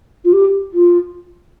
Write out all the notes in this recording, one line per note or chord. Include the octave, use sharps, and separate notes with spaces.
F4
G4
F4